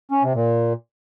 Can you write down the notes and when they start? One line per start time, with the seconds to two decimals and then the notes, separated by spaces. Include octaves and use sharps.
0.11 C#4
0.23 C3
0.35 A#2